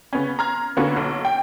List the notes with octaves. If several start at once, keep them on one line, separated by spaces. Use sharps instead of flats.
C#3 B3 C#4
A#5 C6 F6 G#6
D3 A#3 B3 C#4 F#4
B1
G5